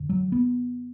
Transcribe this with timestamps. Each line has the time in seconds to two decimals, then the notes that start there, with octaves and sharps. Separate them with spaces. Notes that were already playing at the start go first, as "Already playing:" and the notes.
Already playing: F#2 D3
0.09 F#3
0.32 B3